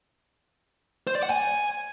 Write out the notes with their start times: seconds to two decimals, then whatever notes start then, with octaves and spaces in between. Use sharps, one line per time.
1.07 C5
1.15 D5
1.23 F#5
1.30 G#5